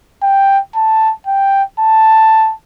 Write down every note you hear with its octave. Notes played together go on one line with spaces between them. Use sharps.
G5
A5
G5
A5